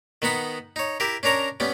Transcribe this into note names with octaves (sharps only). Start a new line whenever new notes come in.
D#3 B3 D#4 F#5 B5
D#4 C#5
E4 G4 A#4
C#4 D4 A#4 C#5 A#5
G3 B3 C#4